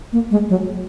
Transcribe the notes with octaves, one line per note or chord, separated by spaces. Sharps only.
A#3
G#3
F#3